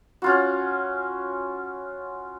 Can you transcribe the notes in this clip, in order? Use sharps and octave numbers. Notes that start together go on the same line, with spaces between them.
C#4 F4 F#4